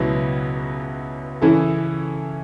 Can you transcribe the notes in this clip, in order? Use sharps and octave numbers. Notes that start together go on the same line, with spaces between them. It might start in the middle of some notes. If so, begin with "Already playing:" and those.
Already playing: C#2 B2 F#3 B3 E4
C#3 E3 C#4 E4 A4